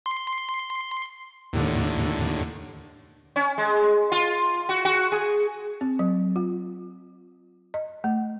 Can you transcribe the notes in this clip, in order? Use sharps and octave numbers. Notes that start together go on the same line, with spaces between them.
C6
D#2 A2 D3
C#4
G#3
F4
F#4
F#4
G#4
C4
F#3
F4
D#5
A3